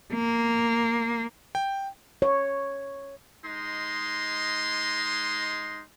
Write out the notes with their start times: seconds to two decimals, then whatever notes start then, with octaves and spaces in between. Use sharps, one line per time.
0.13 A#3
1.55 G5
2.22 C#5
3.45 G#3 D#4 C6